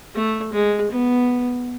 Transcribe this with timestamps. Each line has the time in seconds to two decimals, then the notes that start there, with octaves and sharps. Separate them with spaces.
0.15 A3
0.53 G#3
0.91 B3